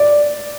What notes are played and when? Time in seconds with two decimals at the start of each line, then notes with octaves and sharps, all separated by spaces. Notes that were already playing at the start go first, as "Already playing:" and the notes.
Already playing: D5